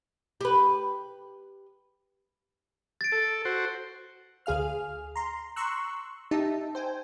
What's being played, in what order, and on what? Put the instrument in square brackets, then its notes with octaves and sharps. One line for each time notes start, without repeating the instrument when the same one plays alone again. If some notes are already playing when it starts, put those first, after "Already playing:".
[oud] G4 B4
[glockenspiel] A6 D7
[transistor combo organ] A4
F#4 C5
[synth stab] D2 G#4 F5 F6
A#5 C6
A#5 C6 C#6 E6 F#6
D#4 G4 E5 A5
C5 G5 G#5